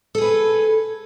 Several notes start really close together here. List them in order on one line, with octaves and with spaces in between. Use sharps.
A4 G#4 B4